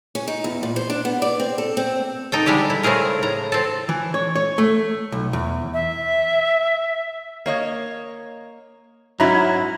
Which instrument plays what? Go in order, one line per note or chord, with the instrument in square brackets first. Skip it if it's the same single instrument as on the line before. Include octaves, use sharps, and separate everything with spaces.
[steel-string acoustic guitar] C#4
D#4
E2
A#2
C5
D4
B3
D5
C4
A4
C4
[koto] D#4 A4 G5
D3 G3 G#3 E4 G4
E4
C#3 A3 C4 G#4 A#4
A2 A#5
C4 A4
[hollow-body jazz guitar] E3
C#5
C#5
A3
B1
E2
[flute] E5
[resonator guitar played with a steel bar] A#3 C#5 D#5
[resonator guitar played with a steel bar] G#2 C#4 E4 [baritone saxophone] F#3 [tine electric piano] A#5 B5